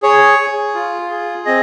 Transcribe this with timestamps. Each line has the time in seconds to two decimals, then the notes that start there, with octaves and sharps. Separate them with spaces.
0.02 G#4 C#5
0.38 G#4
0.75 F4
1.10 G#4
1.46 C4 D#5